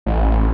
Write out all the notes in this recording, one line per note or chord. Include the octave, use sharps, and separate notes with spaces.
A1